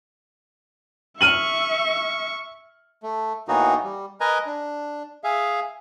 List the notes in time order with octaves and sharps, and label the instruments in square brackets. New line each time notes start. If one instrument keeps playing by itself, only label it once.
[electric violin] E5 C#6 [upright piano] F6 D#7 F#7
[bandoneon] A3
A2 E3 A#3 B3 D#4 F#4
G3
A#4 B4 D#5 G#5 A#5
D4
G#4 E5 F5